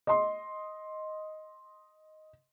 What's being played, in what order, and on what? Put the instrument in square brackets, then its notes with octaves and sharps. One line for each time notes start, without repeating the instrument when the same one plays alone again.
[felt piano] D#5 C6